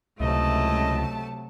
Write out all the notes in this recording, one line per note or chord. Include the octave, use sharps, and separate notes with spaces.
C#2 C3 F#3 A3 E4 D#5 A5